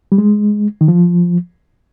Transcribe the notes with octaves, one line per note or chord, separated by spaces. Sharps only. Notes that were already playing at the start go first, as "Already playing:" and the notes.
G3
G#3
D#3
F3